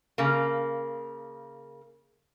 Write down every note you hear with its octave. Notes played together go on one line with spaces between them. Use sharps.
C#3 A#3